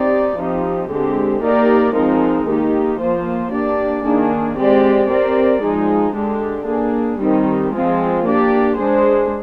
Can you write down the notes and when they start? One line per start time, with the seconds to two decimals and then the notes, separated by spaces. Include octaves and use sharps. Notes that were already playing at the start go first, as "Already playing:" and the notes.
Already playing: C4 D#4 G4 D5
0.37 F3 C4 D#4 G4
0.90 D3 G#3 C4 G4
1.43 A#3 D#4 G4 A#4 D5
1.94 F3 G#3 C4 D#4 A#4
2.47 D#3 A#3 D#4 G4
3.00 F3 A#3 F4 C5
3.51 A#3 D4 G4 D5
4.05 D#3 A#3 D4 G#4
4.57 G#3 C4 G4 D5
5.09 C4 G4 A#4 D5
5.62 F3 G#3 D#4 G#4
6.15 D3 G#3 D4 G4
6.67 A#3 D4 G#4
7.19 D#3 G3 C4 D#4 G4
7.73 F3 G#3 C4 F4 G#4
8.24 A#3 D4 G4 D5
8.77 G#3 D4 G#4 C5